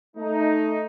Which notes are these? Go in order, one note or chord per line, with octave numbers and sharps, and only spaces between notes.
A3 D#4